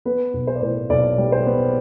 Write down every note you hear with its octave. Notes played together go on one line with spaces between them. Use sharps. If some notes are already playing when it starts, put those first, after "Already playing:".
B3 B4
B1
C5
D5
A2 C5
B1 D5
G3
C5
B3